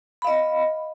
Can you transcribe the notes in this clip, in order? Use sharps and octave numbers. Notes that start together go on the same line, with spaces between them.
D#5 F5 B5